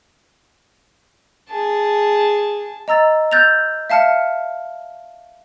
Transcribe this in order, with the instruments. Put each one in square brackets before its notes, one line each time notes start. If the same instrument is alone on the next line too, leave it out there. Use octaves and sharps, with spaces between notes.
[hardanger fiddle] G#4 A5
[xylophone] D#5 A#5 E6 A6
E6 F#6 G6 A6 A#6 F7
E5 F5 A5 F6 C#7